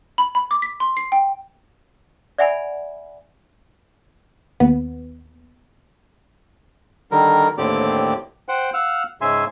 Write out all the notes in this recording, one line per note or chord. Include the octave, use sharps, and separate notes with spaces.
B5
B5
D6
B6
C6
C7
G5
D5 E5 F#5 G#5 B5
D#2 B3
D3 D#3 G3 A#4
D#2 A2 D3 C4 G4 D5
C5 F#5 G5
F5 F#5 E6 F6
G#2 C#3 E5 G#5 C6